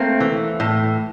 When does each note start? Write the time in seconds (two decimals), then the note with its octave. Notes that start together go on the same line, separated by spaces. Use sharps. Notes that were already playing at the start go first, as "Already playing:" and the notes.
Already playing: A3 A#3 C4
0.20 E3
0.60 A2